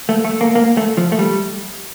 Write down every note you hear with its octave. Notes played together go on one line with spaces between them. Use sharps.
A3
A3
A#3
A#3
A3
F3
A3
G3